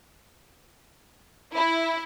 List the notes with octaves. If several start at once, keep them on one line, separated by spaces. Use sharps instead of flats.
E4